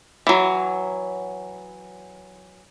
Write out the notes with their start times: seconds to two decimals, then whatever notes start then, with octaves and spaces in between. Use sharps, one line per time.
0.27 E3 F#3